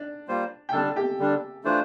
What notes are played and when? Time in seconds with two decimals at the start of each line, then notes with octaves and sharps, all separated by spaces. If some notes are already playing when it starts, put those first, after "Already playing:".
Already playing: D4 D5
0.28 G3 A#3 F4 C5
0.69 G5
0.73 D3 G3 D4 A4 A5
0.96 G4 G5
1.19 D3 G3 D4
1.64 E3 A3 D4 F4 C5